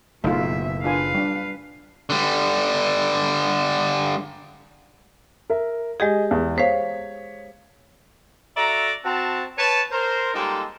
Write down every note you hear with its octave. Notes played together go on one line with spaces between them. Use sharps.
F#1 B2 A3 D#4 F4 E5
D4 F4 B4 F5 G#5
G3 D4
D3 G3
A#4 E5
G#3 G4 G#4 D#5 G#5
E2
C5 C#5 F5 B6
F#4 A4 D5 E5 A#5
C4 F#4 A5
B4 C#5 A5
A#4 C5
G3 G#3 A#3 D#4 F4 A4